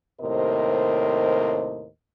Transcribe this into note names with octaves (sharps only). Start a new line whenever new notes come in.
D#2 A2 C3 A#4 C5 D#5